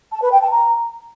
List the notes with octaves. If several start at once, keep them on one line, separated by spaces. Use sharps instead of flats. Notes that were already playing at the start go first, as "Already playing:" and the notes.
A5
B4
G5
A5
A#5